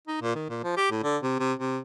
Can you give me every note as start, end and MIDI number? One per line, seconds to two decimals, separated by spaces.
0.07 0.19 63
0.22 0.35 46
0.35 0.46 51
0.50 0.63 46
0.64 0.76 53
0.77 0.91 67
0.91 1.01 45
1.03 1.17 50
1.23 1.36 48
1.39 1.53 48
1.59 1.78 48